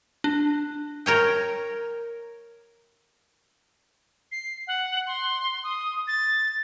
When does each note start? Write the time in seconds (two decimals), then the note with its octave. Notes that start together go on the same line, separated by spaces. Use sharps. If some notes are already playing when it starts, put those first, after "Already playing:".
0.24 D4
1.06 A#4 C#5 G5
4.32 C7
4.67 F#5
5.07 C6
5.64 D#6
6.08 A6